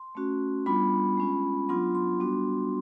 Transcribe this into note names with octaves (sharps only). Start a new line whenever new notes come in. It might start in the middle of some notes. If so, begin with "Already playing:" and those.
Already playing: C6
A3 C#4 F#4
G3 B3 D4 F4 B5
G#3 C#4 F4
F#3 B3 D4 F4 C6
C6
G3 B3 D4 F#4